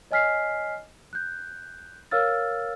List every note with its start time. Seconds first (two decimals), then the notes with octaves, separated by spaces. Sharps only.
0.11 C#5 D#5 G#5 F6 B6 C7
1.13 F#6 G6
2.11 A#4 C#5 F5 E6 F6 A6